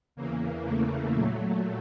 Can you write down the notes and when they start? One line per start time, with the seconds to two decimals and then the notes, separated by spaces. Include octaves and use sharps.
0.16 E2 C#3 E3 A#3
0.64 A3
1.12 A#2 F#3 A3